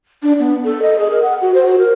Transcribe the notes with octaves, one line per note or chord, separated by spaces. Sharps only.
D4
B3
A4
D#5
G#4
A#4
F#5
F#4
C5
F#4
A#4